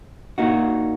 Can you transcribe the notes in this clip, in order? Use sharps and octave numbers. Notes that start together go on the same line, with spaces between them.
A#2 A#3 D#4 F#4